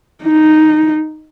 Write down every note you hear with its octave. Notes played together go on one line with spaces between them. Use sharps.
D#4